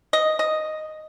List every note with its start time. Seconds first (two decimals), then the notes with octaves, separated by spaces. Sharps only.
0.13 D#5
0.39 D#5